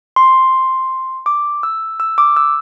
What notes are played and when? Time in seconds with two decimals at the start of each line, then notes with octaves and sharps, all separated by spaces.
0.16 C6
1.26 D6
1.63 E6
2.00 E6
2.18 D6
2.37 E6